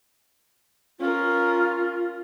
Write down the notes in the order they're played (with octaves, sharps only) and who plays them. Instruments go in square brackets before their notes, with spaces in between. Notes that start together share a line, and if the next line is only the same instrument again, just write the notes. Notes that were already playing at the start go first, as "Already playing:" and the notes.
[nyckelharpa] C#4 A#4 [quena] F4